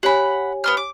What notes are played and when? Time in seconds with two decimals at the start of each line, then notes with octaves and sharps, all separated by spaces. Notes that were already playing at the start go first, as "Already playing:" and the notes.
0.03 G4 C#5 F#5 G#5 B5
0.64 B3 C6 F6
0.77 D6